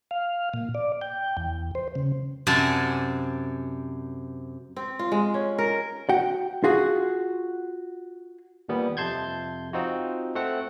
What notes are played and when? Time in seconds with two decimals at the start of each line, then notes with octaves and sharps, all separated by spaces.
0.11 F5
0.54 A#2
0.75 D5
1.01 G5
1.37 E2
1.75 C5
1.95 C#3
2.47 F#2 C3 F#4 D5 G#5 A5
4.76 C4
4.99 F4
5.12 G#3
5.34 C#4
5.58 A#4
6.09 F#4 F#5 G5
6.64 F4 F#4 G#4
8.69 D#2 A#2 G3 B3
8.97 F2 C3 A5 C6 G6 G#6
9.73 C4 D#4 F4 F#4
10.35 A3 C4 F#5